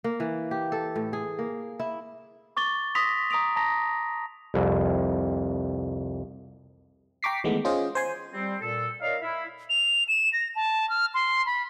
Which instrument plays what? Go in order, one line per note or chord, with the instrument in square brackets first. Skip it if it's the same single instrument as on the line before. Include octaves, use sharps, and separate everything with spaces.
[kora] A#3
E3
G4
A4
A2
G#4
A#3
E4
[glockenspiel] C#6 D6 A6 G7
C6 D#6 A#6 B6 F7
A#5 D#6 D7 F7
A5 A#5 A#6
[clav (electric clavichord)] C2 F2
[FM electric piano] G5 A#5 C#6 D6 B6 C7
D#3 E3 G#3 A3 B3
C#4 F4 G#4 C5 D#5
C5 G#5 C6
[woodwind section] G3 C4
A#2 A4
D#4 A#4 C#5 D5 F5
E4
[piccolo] F7
E7
A#6
A5
F6
C6
B5